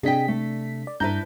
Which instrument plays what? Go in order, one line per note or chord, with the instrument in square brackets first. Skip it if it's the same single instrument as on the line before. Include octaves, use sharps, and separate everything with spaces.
[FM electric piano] C3 D4 B6 [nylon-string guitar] G#4 D#5 G5
[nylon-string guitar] A3
[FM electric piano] D5
[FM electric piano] G2 A#5 G6 [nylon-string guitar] D4 E4 B4